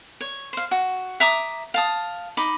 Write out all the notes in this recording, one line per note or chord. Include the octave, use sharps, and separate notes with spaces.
C#5
C5 F5
F#4
E5 A#5 D6 D#6
F5 A5 D#6
D#4 B5 D6